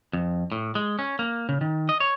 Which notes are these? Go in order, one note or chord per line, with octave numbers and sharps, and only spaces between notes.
F2
A2
G#3
C#4
A#3
C#3
D#3
D#5
C#5